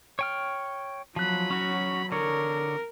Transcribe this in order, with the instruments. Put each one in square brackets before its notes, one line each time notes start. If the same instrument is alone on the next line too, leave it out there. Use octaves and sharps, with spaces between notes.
[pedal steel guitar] C#5 G5 F6
[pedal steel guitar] F3 F#6 [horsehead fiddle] F#3 B5
[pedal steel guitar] C#4 F#4
[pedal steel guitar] D3 C#5 [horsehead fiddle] A#4